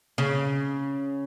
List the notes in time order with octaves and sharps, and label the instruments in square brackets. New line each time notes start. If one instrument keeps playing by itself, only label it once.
[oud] C#3